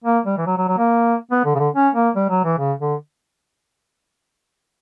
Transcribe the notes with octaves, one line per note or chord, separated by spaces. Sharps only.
A#3
G3
E3
F#3
F#3
F#3
A#3
B3
D3
C#3
D3
C#4
A#3
G3
F#3
E3
C#3
D3